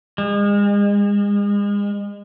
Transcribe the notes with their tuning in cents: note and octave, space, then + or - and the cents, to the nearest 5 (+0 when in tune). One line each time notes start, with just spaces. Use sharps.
G#3 -35